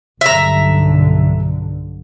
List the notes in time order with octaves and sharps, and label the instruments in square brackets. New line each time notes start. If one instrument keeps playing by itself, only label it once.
[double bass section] B1 G2 D3 [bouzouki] E5 A#5